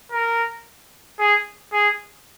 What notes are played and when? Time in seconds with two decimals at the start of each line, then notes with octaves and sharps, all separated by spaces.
0.12 A#4
1.19 G#4
1.73 G#4